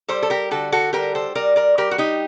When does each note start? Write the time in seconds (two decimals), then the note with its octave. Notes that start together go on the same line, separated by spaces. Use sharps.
0.08 G3 A4 C5
0.23 A4
0.30 G4 A#4
0.51 D3 F#4 A4
0.72 F#4 A4
0.93 G3 G4 A#4
1.15 A4 C5
1.35 G3 A#4 D5
1.56 A#4 D5
1.78 G3 G4 A#4
1.91 F#4
1.98 D#4 G4